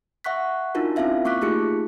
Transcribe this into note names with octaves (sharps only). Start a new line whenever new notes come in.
E5 F#5 C#6 F#6 B6
D4 D#4 F4 F#4 A#4
C4 C#4 E4 F4 E5 F5
A#3 C#6 D6 F#6 B6
A3 D#4 F4 G4 G#4 C#7